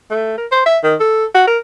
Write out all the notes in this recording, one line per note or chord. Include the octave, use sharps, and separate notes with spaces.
A3
A#4
C5
E5
D#3
A4
F#4
A#4